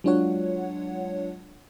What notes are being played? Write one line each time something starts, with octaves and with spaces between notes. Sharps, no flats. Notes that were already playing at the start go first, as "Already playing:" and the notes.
F#3 G#3 D4 F4 C#5 F#5